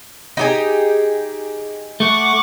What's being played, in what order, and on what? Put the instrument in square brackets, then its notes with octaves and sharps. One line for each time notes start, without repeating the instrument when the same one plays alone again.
[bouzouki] D#4 G4 G#4
[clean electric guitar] A3 [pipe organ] F#5 C#6 D6